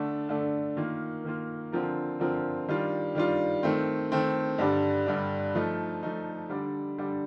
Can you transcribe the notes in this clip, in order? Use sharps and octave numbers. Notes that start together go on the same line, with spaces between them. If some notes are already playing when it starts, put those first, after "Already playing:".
Already playing: D3 A3 D4
D3 A3 D4
D#3 A#3 F4
D#3 A#3 F4
D3 F3 C4 F4 A#4
D3 F3 C4 F4 A#4
D#3 G3 D4 F4
D#3 G3 D4 F4
D#3 A3 C4
D#3 A3 C4
G2 D3 G3 D4
G2 D3 G3 D4
F3 A3 D#4
F3 A3 D#4
D3 G3 D4
D3 G3 D4